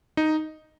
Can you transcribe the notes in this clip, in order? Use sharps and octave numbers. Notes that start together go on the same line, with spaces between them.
D#4